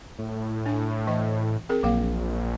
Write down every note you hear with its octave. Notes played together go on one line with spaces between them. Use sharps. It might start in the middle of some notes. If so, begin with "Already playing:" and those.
A2
D4 G#5
E3 D#5
C4 G#4 A#4
A#1 F#3 A#3 F5